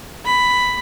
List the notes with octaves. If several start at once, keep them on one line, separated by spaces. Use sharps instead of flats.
B5